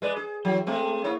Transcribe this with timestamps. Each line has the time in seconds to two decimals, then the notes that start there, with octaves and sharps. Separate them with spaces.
0.02 G#3 B4 D5
0.17 G#4
0.45 E3 F#3 E4
0.67 G#3 A3 C4
1.04 A#3 E4 C#5